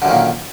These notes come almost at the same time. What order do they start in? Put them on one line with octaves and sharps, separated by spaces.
D3 F#2 D#3 A#2